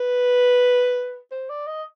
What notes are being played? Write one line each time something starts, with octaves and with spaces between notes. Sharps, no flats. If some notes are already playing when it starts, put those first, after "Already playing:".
Already playing: B4
C5
D5
D#5